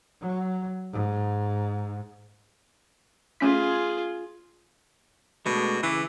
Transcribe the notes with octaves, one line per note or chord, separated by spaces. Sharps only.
F#3
G#2
A3 C#4 F4 G#4 B6
B2 G#3 A3 D4
C#3 E3 E5 D6